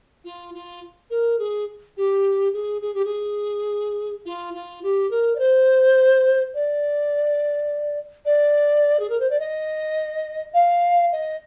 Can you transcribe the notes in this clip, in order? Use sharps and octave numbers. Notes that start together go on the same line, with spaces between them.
F4
F4
A#4
G#4
G4
G#4
G#4
G4
G#4
F4
F4
G4
A#4
D5
C5
D5
D5
G#4
A#4
C5
D5
D#5
F5
D#5